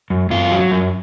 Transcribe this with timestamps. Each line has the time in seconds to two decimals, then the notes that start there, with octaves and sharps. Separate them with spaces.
0.10 F#2
0.30 F#2 F4
0.51 F#3
0.71 F#2